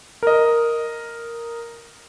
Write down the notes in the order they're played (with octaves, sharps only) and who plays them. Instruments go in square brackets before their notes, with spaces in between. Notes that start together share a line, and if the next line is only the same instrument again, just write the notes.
[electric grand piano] A#4 D#5